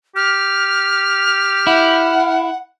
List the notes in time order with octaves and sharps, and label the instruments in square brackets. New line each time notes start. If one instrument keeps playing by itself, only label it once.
[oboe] G4 [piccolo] F6
[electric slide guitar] E4 [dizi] F#5